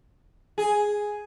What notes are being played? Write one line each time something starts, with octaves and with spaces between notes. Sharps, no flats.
G#4